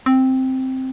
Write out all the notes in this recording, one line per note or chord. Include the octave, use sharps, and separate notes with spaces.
C4